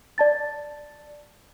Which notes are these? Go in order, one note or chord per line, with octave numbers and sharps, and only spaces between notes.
D5 A5 A6